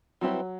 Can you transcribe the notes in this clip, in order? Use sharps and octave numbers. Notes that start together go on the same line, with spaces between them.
F#3 G3 C4 E4 G4 B4